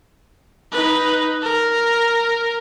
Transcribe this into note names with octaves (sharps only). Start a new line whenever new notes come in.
D#4 B4
A#4